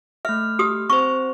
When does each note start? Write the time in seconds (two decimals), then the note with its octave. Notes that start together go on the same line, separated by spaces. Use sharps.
0.25 A3 E5 F6
0.59 G4 D#6
0.90 C4 C5 C#6